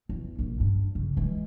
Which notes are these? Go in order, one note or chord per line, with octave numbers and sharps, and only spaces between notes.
E2
A#1
G2
C#3
E3 G#3